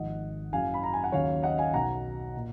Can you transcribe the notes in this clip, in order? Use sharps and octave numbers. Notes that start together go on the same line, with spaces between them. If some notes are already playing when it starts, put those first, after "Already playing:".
Already playing: G#1 G#2 F3 D#5 F#5
F#1 F#2 C#3 F#3 F5 G#5
B5
A#5
G#5
F#5
D#2 C#3 F#3 C#5 F5
D#5 F#5
F5 G#5
B1 B2 F#3 F#5 A#5
A#2